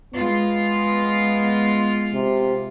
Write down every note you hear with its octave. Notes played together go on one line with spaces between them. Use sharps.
G#3 B3 F4
C3